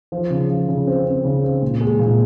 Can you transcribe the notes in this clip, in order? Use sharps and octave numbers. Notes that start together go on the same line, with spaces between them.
F3
C#3
F3
C#3
C4
C4
C#3
C4
A#2
G#3
A#2